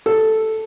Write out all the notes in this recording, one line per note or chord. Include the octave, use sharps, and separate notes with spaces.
A4